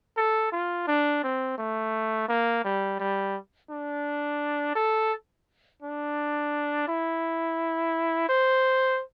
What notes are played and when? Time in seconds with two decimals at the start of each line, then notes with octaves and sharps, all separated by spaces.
0.17 A4
0.52 F4
0.87 D4
1.23 C4
1.58 A3
2.29 A#3
2.64 G3
2.99 G3
3.70 D4
4.75 A4
5.82 D4
6.88 E4
8.29 C5